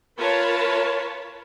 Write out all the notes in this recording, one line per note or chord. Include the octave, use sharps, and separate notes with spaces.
F4 A#4 B4 C#5 A5 B5